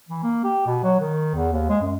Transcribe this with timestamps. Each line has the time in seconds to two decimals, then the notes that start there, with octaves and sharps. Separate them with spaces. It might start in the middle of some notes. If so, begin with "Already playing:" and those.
0.09 E3
0.23 A#3
0.44 G4
0.67 B2
0.84 F#3
1.00 D#3
1.35 E2
1.53 D#2
1.69 G#3
1.82 F#2